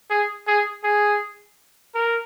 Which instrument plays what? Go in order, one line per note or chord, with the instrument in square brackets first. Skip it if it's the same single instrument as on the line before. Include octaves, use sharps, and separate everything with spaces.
[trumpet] G#4
G#4
G#4
A#4